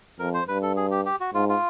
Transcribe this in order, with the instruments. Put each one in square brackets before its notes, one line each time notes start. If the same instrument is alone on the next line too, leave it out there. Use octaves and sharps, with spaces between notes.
[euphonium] F2 [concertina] A#4
[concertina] C5
[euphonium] G2 [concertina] B4
[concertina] A4
G#4
G4
G4
F#4
[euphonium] G#2 [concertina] F4
[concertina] F4